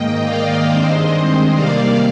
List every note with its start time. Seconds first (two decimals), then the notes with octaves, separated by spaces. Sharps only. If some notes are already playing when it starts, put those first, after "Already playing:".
Already playing: G#2 D#3 A#3 D#5 G5
0.24 D5 F5
0.68 G2 D#3 G#3 C4 C5 D#5
1.54 C3 D#3 G3 A#3 D5 F5